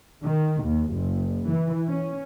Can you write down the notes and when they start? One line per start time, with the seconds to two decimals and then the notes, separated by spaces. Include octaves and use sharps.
0.25 D#3
0.63 D#2
0.92 F#1
1.50 E3
1.89 C#4